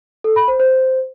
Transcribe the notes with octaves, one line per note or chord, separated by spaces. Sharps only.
A4
B5
C5
C5